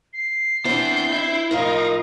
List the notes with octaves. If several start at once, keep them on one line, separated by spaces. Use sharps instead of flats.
C7
B3 C4 D4 E4 G6
E4 E5
A2 F3 D#4 F4 A#4